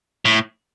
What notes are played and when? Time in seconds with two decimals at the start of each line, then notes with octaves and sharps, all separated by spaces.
0.25 A2